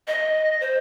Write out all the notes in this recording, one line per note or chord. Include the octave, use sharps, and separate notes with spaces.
D#5
C5